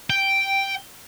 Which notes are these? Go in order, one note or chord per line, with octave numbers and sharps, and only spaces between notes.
G5